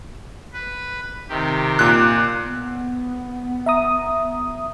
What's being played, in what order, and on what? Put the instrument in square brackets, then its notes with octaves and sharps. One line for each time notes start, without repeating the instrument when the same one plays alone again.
[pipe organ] B4
C3 D#3 G4
[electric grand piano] A#2 F#6
[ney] B3
[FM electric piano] E5 A#5 D#6